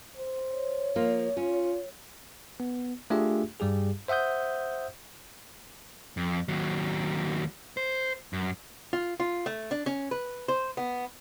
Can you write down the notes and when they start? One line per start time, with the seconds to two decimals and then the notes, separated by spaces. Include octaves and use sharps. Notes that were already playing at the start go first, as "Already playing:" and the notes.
0.17 C5
0.50 C#5
0.96 F3 A#3 F4
1.37 C#4 F4
2.60 B3
3.10 A3 D4 F4 G4 G#4 E5
3.60 G2 G3 G4 G#4
4.08 C5 E5 F#5 D#6 G6
6.17 F2
6.49 D#2 F#3
7.77 C5
8.33 F#2
8.93 F4
9.20 F4
9.46 A3
9.71 D4
9.86 C#4
10.11 B4
10.48 C5
10.77 B3